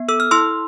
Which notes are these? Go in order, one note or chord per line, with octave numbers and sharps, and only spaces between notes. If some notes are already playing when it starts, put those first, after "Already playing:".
Already playing: B3
A4 E6
F6
E4 C6 E6